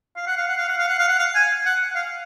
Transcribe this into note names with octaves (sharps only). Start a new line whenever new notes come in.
F5
F#5
F5
F#5
F5
F#5
F5
F#5
F5
F#5
F5
G#5
F#5
F5